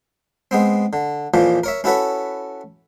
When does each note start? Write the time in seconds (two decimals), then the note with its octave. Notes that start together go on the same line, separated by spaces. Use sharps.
0.51 G#3 B3 C4
0.93 D3
1.34 F2 A#2 E3 F3
1.64 A#4 C#5 E5
1.84 C#4 E4 F#4 A4 B4 C#5